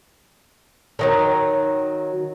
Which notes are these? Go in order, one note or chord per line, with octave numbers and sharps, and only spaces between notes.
D3 D#3 F#3